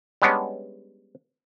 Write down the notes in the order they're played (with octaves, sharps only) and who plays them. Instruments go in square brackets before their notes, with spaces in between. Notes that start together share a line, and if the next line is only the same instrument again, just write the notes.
[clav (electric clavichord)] G3 G#3 B3 C#4 D4